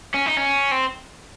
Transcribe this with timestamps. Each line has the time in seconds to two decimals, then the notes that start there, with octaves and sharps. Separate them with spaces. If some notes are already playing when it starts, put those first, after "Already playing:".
0.14 C#4
0.26 D#4
0.37 C#4
0.71 C4